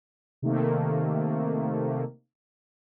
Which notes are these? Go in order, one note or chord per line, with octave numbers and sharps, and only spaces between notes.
C3 D#3 A3 A#3